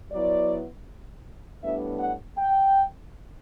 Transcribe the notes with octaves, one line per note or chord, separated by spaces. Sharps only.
F#3 B3 E4 D5
A2 G3 B3 D4 E5
F#5
G5